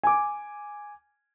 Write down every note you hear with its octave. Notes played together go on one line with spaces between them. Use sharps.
G#5 D6